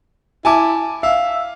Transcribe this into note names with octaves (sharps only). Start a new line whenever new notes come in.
E4 G#5 A5 D6
E5 F5